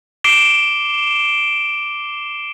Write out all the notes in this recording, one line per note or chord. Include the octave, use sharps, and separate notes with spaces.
D6 C7 D7 E7 G7